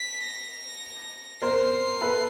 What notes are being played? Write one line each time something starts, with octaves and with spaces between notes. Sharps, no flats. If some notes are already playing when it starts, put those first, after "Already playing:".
Already playing: B6
A#6
A#4 C5 C7
A4 B4